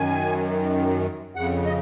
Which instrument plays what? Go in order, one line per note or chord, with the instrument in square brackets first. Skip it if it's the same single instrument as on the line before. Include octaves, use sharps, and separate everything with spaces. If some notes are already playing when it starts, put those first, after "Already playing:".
Already playing: [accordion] F#2 D#3 G#5
F2 C#3 F#5
D#5